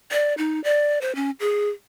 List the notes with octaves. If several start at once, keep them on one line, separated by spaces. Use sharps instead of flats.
D5
D#4
D5
C5
C#4
G#4